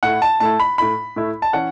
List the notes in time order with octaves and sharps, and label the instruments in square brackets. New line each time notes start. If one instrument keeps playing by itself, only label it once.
[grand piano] A2 A3 E4 F#5
A5
A2 A3 E4 A5
B5
A2 A3 E4 B5
A2 A3 E4
A5
E3 C#4 F#5